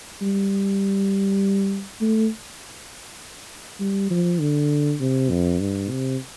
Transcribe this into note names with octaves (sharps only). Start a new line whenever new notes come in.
G3
A3
G3
F3
D3
C3
F2
G2
C3